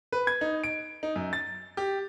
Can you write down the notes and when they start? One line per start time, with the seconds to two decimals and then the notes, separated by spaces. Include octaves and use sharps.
0.12 B4
0.27 G#6
0.41 D#4
0.64 D7
1.03 D#4
1.16 F#2
1.33 A6
1.77 G4